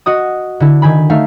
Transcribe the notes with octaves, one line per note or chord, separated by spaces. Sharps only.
F#4 D#5 D#6
D3 E4
D#3 G#5 B5
A3 D#4 E5 F5